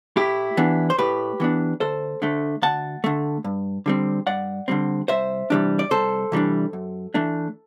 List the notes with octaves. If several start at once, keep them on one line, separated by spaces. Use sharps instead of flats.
A2 E4 G4
E3 B3 D4
C5
A2 G4 B4
E3 B3 D4
D2 A4 C5
D3 A3
D2 F#5 A5
D3 A3
G2
D3 G3 C4
G2 D5 F#5
D3 G3 C4
C2 C5 E5
C3 E3 G3 D4
D5
C2 A4 C5
C3 E3 G3 D4
F#2
E3 A3 D4